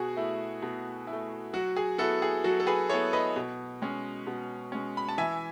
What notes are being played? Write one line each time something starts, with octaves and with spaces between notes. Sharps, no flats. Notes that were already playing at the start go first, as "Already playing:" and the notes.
Already playing: B2 F#4 G#4
A3 E4
B2
E4
A3
F#3 F#4
G#4
B3 E4 F#4 A4
G#4
F#3 F#4 A4
A4
G#4 B4
B3 E4 A4 C#5
B4 D#5
B2
G#3 C#4
B2
G#3 C#4
B5
A5
E3 E5 G#5